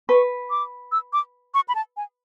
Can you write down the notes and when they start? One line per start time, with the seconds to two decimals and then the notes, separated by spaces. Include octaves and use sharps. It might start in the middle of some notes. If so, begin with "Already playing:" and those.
0.09 B4 C#6
0.50 D6
0.92 E6
1.13 D6
1.54 C#6
1.68 B5
1.75 A5
1.97 G#5